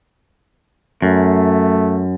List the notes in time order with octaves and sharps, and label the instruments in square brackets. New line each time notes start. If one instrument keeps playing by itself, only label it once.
[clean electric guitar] F#2 [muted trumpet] A3